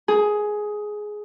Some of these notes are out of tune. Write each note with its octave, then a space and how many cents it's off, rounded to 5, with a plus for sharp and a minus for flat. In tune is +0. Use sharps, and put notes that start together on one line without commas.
G#4 +10